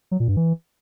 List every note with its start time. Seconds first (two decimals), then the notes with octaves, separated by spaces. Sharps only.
0.11 F#3
0.20 A#2
0.28 G2
0.36 E3